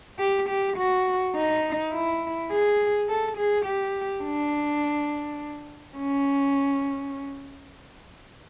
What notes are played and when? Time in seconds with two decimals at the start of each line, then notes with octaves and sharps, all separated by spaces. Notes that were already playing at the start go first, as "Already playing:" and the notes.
0.19 G4
0.49 G4
0.77 F#4
1.36 D#4
1.92 E4
2.51 G#4
3.09 A4
3.38 G#4
3.66 G4
4.23 D4
5.97 C#4